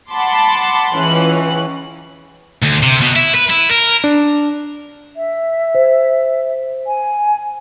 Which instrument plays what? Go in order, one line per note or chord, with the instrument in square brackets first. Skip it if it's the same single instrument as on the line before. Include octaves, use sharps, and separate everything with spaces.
[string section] F#5 A5 B5 C6 D6
C#2 E3 C#4 F#6
[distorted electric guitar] D2
C3
B2
E4
B4
E4
A#4
[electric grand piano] D4
[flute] E5
[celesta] C5
[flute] G#5